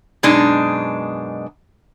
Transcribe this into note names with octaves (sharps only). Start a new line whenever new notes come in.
F#2 B2 G#3 D4 D#4